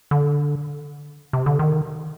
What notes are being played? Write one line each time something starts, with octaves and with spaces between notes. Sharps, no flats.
D3
C3
D3
D#3